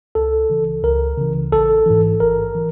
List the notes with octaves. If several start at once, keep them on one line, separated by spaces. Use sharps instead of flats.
C#2 A4
C#3 E3
C#2 A#4
C#3 E3
A1 A4
G#2 E3
A1 A#4
E3